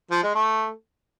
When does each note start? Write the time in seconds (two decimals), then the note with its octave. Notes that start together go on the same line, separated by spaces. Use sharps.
0.11 F3
0.23 G#3
0.35 A3